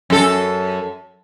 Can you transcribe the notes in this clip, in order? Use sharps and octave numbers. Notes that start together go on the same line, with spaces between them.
F#2 A4